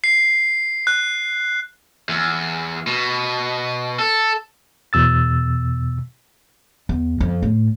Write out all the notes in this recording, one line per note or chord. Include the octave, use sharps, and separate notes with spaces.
C7
F#6
E2
B2
A4
E2 B2 E6 A6
E2
F2
A2